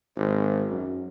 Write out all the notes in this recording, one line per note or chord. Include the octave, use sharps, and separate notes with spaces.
G#1
F#2